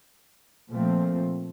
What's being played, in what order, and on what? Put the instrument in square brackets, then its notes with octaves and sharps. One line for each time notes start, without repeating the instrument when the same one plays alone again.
[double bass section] A#2 F3 A3 C4